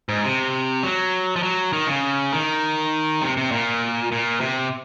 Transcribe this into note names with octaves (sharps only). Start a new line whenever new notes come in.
G#2
C3
F#3
F3
F#3
D#3
C#3
D#3
C3
C3
A#2
A#2
C3